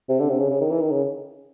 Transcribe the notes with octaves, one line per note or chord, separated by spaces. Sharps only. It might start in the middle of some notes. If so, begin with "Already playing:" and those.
C3
D3
C3
C#3
C#3
D#3
E3
D#3
C#3